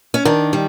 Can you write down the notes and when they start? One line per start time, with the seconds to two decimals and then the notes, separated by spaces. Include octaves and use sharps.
0.14 C#4
0.25 D#3 D4
0.53 G3